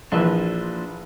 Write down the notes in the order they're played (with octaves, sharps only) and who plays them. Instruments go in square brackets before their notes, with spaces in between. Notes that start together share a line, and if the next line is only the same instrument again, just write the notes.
[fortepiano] A#1 E3 [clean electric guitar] F3 A#3 D4